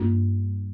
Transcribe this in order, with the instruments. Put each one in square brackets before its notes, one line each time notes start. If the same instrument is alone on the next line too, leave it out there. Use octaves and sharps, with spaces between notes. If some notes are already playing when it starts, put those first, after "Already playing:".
Already playing: [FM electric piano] G2 [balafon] A#3 D4 F4